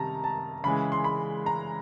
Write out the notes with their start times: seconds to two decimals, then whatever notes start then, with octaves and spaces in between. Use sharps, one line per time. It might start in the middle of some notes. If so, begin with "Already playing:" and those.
Already playing: C3 D#3 G3 A5 A#5
0.24 A5
0.64 C#3 E3 G#3 B5
0.92 C6
1.04 B5
1.46 A#5